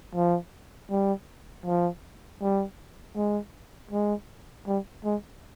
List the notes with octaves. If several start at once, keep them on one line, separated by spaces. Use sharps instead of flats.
F3
G3
F3
G3
G#3
G#3
G3
G#3